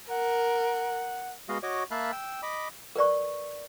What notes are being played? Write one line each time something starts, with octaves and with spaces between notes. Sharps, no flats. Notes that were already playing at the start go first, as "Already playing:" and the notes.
A#4 F#5
G#3 B3 F#4 D#5 F5
F#4 C#5 D#5 D6
A#3 E5 F5 A5 B5 F#6
G5 E6
D#5 B5 D6
A#4 B4 D5 C#6